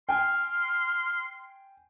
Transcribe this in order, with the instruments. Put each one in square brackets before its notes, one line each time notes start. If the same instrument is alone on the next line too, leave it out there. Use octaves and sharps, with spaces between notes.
[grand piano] G5 G#5 [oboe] C6 [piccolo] F6